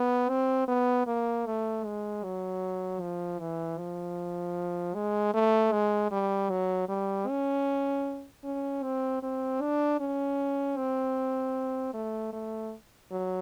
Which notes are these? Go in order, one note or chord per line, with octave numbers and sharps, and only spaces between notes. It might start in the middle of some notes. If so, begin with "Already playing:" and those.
Already playing: B3
C4
B3
A#3
A3
G#3
F#3
F3
E3
F3
G#3
A3
G#3
G3
F#3
G3
C#4
C#4
C4
C4
D4
C#4
C4
A3
A3
F#3